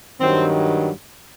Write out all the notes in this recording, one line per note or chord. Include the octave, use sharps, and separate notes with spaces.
G2 D#3 F#3 C4